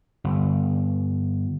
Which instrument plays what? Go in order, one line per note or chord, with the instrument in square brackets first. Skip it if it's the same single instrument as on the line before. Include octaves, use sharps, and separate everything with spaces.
[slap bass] G1